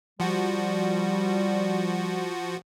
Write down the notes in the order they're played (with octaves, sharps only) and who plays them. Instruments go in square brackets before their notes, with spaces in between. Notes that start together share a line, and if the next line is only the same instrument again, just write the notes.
[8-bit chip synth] F3 F#4 [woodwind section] G3